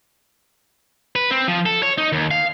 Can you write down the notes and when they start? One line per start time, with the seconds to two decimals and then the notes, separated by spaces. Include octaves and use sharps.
1.15 B4
1.31 C4
1.48 F3
1.66 A4
1.83 C#5
1.98 D#4
2.12 D#2
2.31 F5